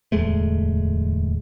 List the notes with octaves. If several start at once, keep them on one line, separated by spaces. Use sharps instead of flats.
D1 E2 G#3 A3